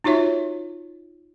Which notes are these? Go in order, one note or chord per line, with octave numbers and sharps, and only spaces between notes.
D#4 F4 F#4 C#5 E5